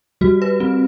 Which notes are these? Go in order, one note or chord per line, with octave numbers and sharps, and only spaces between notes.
G3 F#4
B4
C4